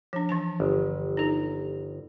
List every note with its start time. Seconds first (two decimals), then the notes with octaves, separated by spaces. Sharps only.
0.13 F3 D4
0.29 E3 D4 A5
0.60 G1
1.17 D#4 A4